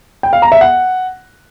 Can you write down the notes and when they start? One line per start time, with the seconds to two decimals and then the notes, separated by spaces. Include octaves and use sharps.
0.23 G5
0.33 F5
0.42 A#5
0.52 E5
0.61 F#5